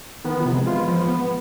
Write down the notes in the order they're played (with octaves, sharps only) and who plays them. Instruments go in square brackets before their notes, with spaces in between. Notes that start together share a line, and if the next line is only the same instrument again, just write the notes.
[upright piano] D#3 [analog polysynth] B3
[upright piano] F3
[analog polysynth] C3
[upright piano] G#3
[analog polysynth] F4
[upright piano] B3
[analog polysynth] F3
B3